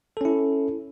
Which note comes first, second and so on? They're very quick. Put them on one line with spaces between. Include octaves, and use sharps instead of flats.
A4 C#4 E4